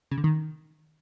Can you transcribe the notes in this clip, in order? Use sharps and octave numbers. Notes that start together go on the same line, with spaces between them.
C#3
D3
D#3